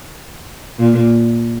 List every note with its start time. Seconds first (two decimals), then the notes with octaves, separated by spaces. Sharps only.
0.79 A#2